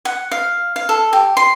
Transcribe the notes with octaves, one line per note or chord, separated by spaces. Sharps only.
F#5
F5
F5
A4
G4
C6